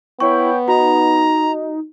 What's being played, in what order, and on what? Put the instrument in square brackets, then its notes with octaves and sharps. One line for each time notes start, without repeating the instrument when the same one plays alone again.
[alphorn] B3 [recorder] E4 [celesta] C#5 C#6 [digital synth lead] G5
[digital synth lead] D#4 [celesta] F#4 [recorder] A#5